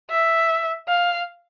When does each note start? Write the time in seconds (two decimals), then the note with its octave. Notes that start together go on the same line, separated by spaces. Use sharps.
0.10 E5
0.89 F5